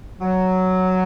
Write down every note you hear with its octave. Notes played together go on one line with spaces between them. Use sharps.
F#3